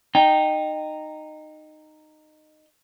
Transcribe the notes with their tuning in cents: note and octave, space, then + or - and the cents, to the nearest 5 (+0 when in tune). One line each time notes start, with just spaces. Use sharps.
D#4 -15 G5 +0